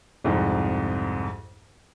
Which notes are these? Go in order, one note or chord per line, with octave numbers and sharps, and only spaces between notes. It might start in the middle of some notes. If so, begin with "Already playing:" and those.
C2 F2 G#2